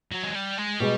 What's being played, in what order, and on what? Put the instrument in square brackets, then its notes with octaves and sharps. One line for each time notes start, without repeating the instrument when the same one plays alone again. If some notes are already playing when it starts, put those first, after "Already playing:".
[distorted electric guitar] F#3
G#3
G3
G#3
[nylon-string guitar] B2 G#3 [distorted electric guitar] G3